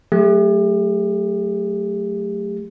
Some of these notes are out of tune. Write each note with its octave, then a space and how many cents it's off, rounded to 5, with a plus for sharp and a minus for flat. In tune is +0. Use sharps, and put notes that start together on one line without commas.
F#3 +0 A3 +0 G4 +40